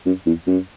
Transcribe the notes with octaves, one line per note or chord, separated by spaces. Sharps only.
F#2
E2
F#2